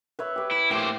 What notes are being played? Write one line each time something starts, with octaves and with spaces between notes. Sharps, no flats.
B4 C#5 E5
G4 B4
E4
A2 A#3 G4 C5